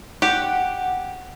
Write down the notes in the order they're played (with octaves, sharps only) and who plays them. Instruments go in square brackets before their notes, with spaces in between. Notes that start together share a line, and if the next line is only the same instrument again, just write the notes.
[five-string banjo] G4 [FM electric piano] F#5